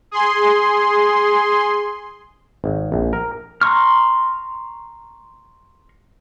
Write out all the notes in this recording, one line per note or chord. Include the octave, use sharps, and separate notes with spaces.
G#4 C6
G#1
A#1
A#4
A#5 C6 C#6 F6